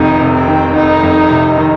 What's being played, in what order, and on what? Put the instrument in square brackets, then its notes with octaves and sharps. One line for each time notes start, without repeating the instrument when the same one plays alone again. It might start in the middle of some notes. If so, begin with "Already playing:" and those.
Already playing: [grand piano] F1 F2 C3 D#3 [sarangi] D#4
[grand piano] C3
[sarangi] C4
[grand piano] D#3
[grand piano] F1 [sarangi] D#4
[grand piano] F2
C3
D#3